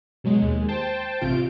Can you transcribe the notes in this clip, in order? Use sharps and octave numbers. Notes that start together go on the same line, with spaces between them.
B2 F#3 G#3
D#2 G#3
C5 G5 A5
A1 C3 F4 D7